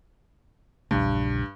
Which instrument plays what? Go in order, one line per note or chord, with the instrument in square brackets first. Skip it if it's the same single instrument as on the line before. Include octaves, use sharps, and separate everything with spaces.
[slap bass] A#1 E2 C#3 [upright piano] G2